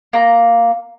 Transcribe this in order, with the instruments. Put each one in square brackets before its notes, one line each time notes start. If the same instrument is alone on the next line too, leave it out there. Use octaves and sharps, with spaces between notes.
[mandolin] A#3 A#5